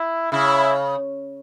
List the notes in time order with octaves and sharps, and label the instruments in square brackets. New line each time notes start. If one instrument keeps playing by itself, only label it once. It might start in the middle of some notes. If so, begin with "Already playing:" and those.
Already playing: [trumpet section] E4
[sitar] C#3 [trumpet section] E4